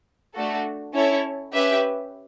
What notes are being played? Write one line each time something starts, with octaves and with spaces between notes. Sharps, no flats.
A3 D4 F#4 A4
C#4 E4 A4 C#5
C#4 G4 B4 E5